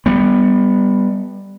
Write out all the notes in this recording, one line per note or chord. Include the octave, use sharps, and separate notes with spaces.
G3 B3